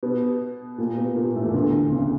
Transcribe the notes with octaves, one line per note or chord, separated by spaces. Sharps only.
B2 B3
A#2 A#3
B2 B3
A#2 A#3
A2 A3
E2 E3
D2 D3
C#2 C#3